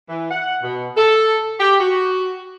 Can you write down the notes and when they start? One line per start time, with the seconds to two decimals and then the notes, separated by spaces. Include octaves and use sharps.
0.09 E3
0.30 F#5
0.62 B2
0.96 A4
1.59 G4
1.79 F#4